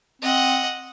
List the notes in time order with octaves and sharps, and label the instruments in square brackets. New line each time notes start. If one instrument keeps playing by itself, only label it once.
[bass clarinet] C4 [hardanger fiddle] D#5 F#5